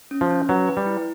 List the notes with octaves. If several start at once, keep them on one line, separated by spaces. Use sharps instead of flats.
C#4
F3
C#4
F#3 B4
B4
G3
E4